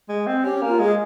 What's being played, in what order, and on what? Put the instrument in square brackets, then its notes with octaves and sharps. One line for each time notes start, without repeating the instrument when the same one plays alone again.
[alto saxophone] G#3
C4
[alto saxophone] C#4 [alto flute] G4
[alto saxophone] A#3
[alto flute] F4
[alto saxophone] G#3 [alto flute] G#4